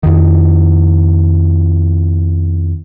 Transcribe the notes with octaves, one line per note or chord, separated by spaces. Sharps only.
F2 D#3